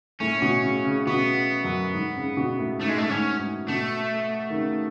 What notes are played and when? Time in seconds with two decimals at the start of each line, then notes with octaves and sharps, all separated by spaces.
0.20 A2 C#4
0.42 B2
0.63 C#3
0.85 C#3
1.07 B2 B3
1.64 F#2
1.94 G#2
2.16 C#3
2.37 B2
2.59 A2
2.81 G#2 A3
2.89 G#3
2.98 A3
3.09 G#2 C#4
3.39 G#2
3.68 B2 A3
4.50 D#3
4.55 C#3